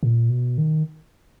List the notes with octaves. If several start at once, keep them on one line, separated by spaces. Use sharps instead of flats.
A#2
B2
D#3